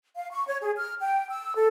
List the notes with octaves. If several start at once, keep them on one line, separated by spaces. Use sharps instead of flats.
F5
C#6
C#5
G#4
F6
G5
E6
A4